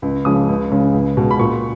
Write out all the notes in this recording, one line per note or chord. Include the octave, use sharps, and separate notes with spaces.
C#2
C#3 F3 G#3 D#6
C#2
C#3 G#3
C#2
B2 G#3
B5
A#2 C#6